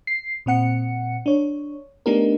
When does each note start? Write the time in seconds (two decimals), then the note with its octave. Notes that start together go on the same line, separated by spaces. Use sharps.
0.07 C7
0.46 A#2 C4 F#5 C#7
1.26 D4 C#5
2.06 A3 B3 D4 D#4 G4 A#4